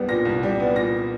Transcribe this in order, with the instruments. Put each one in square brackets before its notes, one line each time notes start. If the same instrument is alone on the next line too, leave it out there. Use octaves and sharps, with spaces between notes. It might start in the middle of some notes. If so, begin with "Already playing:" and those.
Already playing: [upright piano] C2 G3 B3
A#2 A#6
C2
G3
B3
A#2 A#6